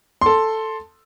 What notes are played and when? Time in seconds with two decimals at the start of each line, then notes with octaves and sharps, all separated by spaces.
0.21 A4 C6